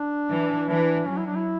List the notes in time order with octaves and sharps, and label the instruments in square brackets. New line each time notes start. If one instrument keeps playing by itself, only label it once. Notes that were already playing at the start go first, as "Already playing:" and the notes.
Already playing: [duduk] D4
[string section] E3
[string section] E3 [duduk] D4
[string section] F#3 [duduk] C#4
[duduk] E4
D4
E4